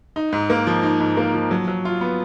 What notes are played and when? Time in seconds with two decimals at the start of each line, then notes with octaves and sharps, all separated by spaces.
0.16 D#4
0.33 G#2
0.50 A#3
0.67 F3
0.83 D#4
1.00 G#2
1.17 A#3
1.34 F3
1.51 F#3
1.68 F#3
1.85 F4
2.01 B3